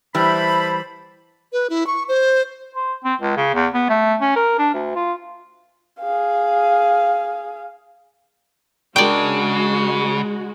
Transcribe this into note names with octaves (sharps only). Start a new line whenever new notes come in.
E3 G3 C5 A5 B5
B4
E4
C#6
C5
C5
C4
C#2
C#3
E2
B3
A3
C#4
A#4
D4
D2
F4
G#4 F5
C#3 G#3 D4 F#4 A#4 D5 G5